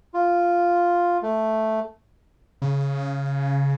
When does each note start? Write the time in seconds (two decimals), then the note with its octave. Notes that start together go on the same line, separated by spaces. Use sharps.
0.14 F4
1.22 A3
2.62 C#3